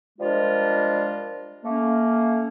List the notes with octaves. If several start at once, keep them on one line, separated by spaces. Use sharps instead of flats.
F3 G3 G#3 D4 F4 A#4
A3 A#3 C#4